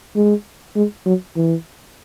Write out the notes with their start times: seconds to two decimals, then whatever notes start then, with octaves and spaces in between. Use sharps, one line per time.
0.16 G#3
0.76 G#3
1.06 F#3
1.36 E3